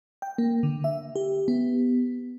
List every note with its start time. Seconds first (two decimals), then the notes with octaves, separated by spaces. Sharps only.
0.22 G5
0.38 A#3
0.63 D3
0.84 E5
1.16 G4
1.48 B3